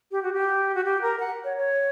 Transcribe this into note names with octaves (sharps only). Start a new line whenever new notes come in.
G4
F#4
G4
F#4
G4
A#4
F#5
C#5
C#5